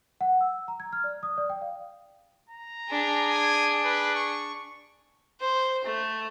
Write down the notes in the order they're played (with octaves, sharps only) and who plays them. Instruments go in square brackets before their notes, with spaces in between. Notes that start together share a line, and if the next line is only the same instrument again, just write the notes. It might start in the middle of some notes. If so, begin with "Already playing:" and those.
[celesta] F#5
E6
A#5
G#6
F6
D5
D#6
D5
G5
F5
[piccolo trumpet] A#5
[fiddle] D4 G#4
[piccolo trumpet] G#5
B4
C#6
[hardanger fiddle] C5
A3